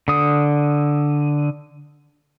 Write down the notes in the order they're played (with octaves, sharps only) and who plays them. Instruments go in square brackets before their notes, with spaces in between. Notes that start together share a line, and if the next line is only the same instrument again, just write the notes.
[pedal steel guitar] D3 D#6